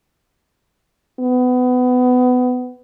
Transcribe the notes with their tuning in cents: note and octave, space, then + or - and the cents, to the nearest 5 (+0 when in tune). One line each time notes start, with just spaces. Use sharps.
B3 +25